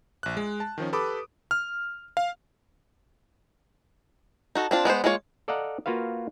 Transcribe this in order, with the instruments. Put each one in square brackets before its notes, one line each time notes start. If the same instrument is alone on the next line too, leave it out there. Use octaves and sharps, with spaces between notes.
[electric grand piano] A#1 F#6
G#3
A5
D#3 F3 C#4
G4 A4 B4 B5 D6 D#6
F6
F5
[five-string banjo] D#4 F#4 A4
C4 D4 F4
G#3 B3 B4 C5
G#3 A#3 F4 C#5
[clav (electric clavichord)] A4 D5 D#5 F5 F#5 A#5
A#3 F4 F#4 B4 F5